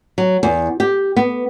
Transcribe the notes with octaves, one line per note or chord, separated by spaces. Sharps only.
F#3
E2
G4
B3